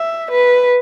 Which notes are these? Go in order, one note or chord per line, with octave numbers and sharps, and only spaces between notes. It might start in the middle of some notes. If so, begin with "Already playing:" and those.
Already playing: E5
B4